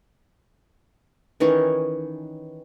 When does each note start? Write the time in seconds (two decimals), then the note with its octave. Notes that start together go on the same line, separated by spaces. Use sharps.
1.40 D#3 E3 C#4 C#5